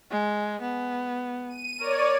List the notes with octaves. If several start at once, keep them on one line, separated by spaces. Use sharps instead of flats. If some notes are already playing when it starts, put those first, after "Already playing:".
G#3
B3
D#7
A#4 C#5 D5